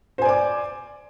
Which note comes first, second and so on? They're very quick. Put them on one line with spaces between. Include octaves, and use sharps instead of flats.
C5 G#5 D5 D6